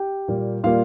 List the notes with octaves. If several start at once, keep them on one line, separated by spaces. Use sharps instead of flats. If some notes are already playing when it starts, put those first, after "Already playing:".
Already playing: G4 G5
A#2 G3 A#3
A#2 G3 A#3 F4 F5